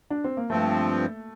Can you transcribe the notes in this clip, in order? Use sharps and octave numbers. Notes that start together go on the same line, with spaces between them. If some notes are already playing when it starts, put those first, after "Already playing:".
D4
C4
A#3
G2 F3 A3 C4